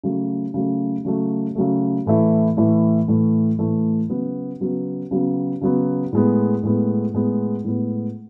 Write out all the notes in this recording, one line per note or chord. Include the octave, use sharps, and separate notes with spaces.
C#3 F#3 A3
C#3 F#3 A3
C#3 F#3 A3
C#3 F#3 A3
A2 E3 A3 E4
A2 E3 A3 E4
A2 E3 A3 E4
A2 E3 A3 E4
C#3 F#3 B3
C#3 F#3 B3
C#3 F#3 B3
C#3 F#3 B3
A2 G#3 B3
A2 G#3 B3
A2 G#3 B3
A2 G#3 B3